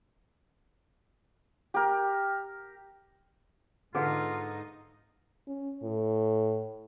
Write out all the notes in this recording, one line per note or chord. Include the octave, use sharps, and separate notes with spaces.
G4 A#4
G#2 D3 D#4 F4 G#4 B4 F5
C#4
A2